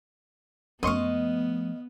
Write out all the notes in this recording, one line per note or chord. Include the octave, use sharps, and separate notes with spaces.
F#2 F3 A3 B3 D#5 F5 C6 C#6